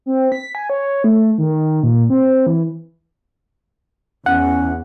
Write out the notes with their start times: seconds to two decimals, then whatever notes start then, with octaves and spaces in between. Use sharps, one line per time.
0.06 C4
0.32 B6
0.55 G#5
0.70 C#5
1.04 A3
1.38 D#3
1.83 A#2
2.10 C4
2.47 E3
4.26 E2 C#4 F#5